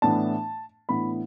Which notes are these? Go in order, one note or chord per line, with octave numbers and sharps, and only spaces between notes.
A2 E3 B3 D4 A5
A2 E3 B3 D4 B5